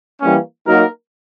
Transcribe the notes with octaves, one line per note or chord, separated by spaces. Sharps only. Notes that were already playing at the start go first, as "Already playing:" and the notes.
E3 G3 A#3 C#4
F#3 A#3 D#4 F#4 A#4